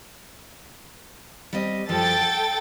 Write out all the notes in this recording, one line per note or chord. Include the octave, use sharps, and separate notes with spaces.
G3 C4 D#5
F#2 F3 G3 A4 G5 A6
F#5